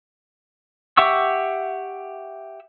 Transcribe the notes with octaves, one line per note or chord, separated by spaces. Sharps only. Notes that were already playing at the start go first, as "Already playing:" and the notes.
G4 E5 F#5 C#6 E6